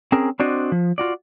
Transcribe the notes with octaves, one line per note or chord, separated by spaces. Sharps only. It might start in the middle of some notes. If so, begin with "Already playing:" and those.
C4 C#4 G#4 A#4
C4 D4 F#4 C5 D5 D#5
F3
F4 F#4 D5